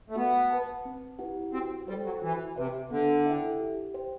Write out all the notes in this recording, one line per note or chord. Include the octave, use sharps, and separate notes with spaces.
A3
B3 F#4
B4 F#5 A5
C4
E4 G4 B4 F#5
C4 F#4
G3 A4 C5 G5
F#3
E3 F#4
C3 B4 E5
D3 B3
E4 A4 E5 G5
G4
C5 G5